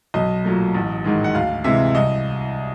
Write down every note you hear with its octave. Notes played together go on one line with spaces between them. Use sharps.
B1 D#5
A#2 F#3 A3
A1
G#2 D#3 G#3
F#5
D2 F5
C3 E3 G#3 E5
C2 D#5